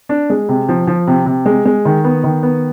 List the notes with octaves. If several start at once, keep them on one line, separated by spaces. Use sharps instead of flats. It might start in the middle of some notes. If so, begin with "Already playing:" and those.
D4
G#3
C3
F3
F3
C3
C3
G#3
G#3
D#3
B3
D#3
B3